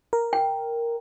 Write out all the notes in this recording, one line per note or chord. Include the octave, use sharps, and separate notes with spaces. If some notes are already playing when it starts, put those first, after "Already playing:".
A#4
G5